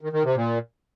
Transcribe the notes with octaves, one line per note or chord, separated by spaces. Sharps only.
D#3
D#3
C3
A#2